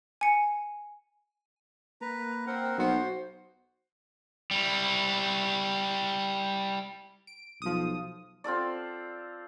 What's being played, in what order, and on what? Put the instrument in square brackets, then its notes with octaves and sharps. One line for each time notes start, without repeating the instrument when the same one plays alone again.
[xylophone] G#5 C#7
[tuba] A#3 [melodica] B4 A#5
[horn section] C4 [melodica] A#4 F#5
[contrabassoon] B1 [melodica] B3 [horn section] F#4 C5
[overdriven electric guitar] G3 E4
[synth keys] D7
[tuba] B1 [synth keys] F3 D#6
[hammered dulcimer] C4 F4 A4 D5